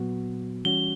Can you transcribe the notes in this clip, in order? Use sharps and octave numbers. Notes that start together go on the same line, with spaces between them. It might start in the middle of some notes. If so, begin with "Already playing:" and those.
Already playing: A#2 F#3 B3 F#4
E3 G3 C#4 F#4 G7